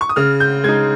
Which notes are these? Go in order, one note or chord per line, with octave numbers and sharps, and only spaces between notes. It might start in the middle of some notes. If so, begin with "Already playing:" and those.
C#6
D#6
C#3 F6
G6
G#3 D#4 G#6